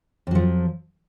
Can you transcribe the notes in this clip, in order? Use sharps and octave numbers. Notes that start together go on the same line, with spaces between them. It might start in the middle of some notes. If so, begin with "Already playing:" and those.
F2 F3 F#3